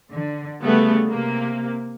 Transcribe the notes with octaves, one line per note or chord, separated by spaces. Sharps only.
D3
C#3 G3 A3 B3
C3 A#3